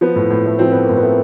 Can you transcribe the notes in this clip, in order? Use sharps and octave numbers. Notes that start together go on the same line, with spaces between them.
F3 B3
A2
A2
A3
F3 C4
A2 B3
A2 A#3
B3
A3